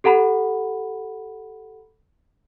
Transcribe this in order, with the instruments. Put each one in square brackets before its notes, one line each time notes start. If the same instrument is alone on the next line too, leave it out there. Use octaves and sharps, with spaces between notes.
[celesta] G4 A4 F#5 A#5 B5